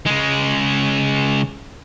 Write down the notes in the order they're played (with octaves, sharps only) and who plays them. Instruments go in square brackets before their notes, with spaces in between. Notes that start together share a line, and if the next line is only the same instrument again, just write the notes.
[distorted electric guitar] C#3 G#3